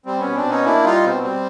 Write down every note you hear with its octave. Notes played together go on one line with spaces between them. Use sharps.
G3 C4
B2 B3 C#4
C4 D4
B2 C#4 D#4
A#3 D4 E4
G3 D#4 F4
B2 C4
G3 C4